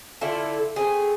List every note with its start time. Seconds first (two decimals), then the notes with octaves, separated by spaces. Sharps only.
0.21 D3 E4 F4 A4
0.76 A3 C4 G#4